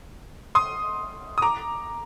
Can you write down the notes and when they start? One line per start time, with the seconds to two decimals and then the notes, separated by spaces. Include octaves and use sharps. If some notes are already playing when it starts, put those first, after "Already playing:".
0.55 C6 D#6
1.38 D#6
1.42 A#5 D6